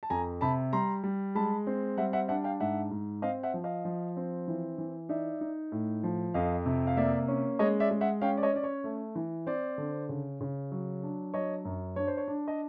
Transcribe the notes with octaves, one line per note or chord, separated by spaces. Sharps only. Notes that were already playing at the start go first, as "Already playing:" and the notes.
A5
F2 G#5 A#5
C3 A5 B5
G3 A#5 C6
G3
G#3 A5 B5
C4
G3 E5 F#5
E5 F#5
D4 E5 F#5
F5 G5
G#2 E5 F#5
G#2
C4 D#5 F5
E5 F#5
F3
D#5 F5
F3
C4
E3
E3
D#4 D5 E5
D#4
A2
F3
F2 D#5 F5
C3
F5
A#3 D5 E5
C#4
G#3 C#5 D#5
D5 E5
G#3
E5 F#5
C#4 F5 G5
D5
C#5 D#5
C#4 D5
C#5
A3
E3
C4 C5 D5
D3
C#3
C#3
F#3
D4
F#3 C#5 D#5
F#2
D4 C#5
C5
C#5
D4
D#5